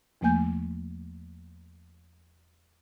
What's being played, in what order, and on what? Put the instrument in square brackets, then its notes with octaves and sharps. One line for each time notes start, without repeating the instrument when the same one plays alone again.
[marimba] E2 F3 A3 A#3 G#5 G6